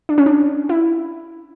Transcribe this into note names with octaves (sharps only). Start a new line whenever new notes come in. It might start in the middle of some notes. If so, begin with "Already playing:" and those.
D4
C#4
D4
E4